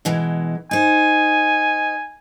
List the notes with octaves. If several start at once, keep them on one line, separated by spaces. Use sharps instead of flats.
B2 E3 G#3
D#4 C5 G#5